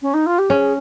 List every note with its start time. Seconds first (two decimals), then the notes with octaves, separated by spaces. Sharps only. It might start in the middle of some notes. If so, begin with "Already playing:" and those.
0.02 C#4
0.13 D#4
0.26 F4
0.38 G4
0.50 C#4 G#4